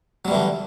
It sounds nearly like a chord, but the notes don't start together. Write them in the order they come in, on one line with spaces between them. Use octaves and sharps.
F#3 G3 E3 D3